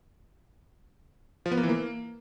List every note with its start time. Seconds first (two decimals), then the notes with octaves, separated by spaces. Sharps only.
1.46 F3
1.52 B3
1.57 A#3
1.63 E3
1.69 A#3